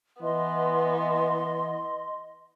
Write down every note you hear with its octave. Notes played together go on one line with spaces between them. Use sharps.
E3 B3 D#5 C6